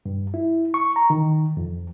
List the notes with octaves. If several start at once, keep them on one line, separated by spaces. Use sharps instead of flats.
G2
E4
C#6
A#5
D#3
F2